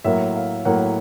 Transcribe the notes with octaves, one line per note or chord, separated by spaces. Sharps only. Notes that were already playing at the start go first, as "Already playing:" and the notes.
A2 F#3 A#3 E5
F5
A2 F#3 A#3 F#5